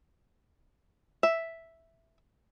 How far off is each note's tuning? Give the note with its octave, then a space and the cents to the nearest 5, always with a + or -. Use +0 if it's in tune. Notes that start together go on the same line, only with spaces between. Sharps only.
E5 +0